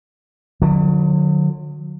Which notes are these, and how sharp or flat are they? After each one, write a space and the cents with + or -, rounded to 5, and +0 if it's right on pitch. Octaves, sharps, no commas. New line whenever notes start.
D3 +25 F#3 -35